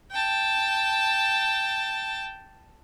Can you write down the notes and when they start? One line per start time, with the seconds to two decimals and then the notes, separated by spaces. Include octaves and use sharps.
0.11 G5 A5